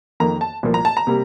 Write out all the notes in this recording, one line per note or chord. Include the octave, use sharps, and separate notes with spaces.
F2 D#3 A#3 A#5
A5
C2 A#2 F3 A#3
A#5
A5
A#5
C3 G3 A#3